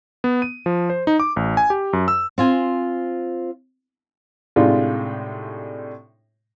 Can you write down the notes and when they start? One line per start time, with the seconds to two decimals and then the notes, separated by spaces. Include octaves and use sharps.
0.24 B3
0.42 D#7
0.66 F3
0.90 C5
1.07 D#4
1.20 D6
1.36 A1
1.57 G#5
1.70 G4
1.93 F#2
2.08 E6
2.38 C4 F4 G#5
4.56 A2 C3 G#3 D4 D#4 F4